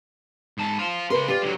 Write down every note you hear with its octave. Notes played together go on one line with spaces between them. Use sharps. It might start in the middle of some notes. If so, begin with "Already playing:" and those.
G#2 A5
C5 F5
C#3 A#4 B4 C6
F4 G4 D5
D3 F#3